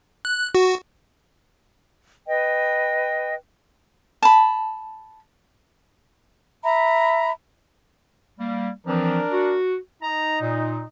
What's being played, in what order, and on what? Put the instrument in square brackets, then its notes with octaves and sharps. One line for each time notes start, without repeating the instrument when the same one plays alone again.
[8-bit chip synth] F#6
F#4
[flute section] B4 D#5 G5
[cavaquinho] A5 B5
[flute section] E5 A#5 B5
[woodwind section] G3 A#3
[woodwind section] E3 F3 C4 [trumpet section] D4 A#4
[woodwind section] F#4
[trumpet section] D#4 [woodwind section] A#5
[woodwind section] A#2